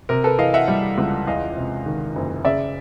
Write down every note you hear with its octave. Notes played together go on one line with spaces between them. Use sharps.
C3 A#4
A4 B4
E3 D#5 F5
E5 F#5
G3
C#2
E2 D#5 F5
C3
D#3
F#1
C#3 D5 E5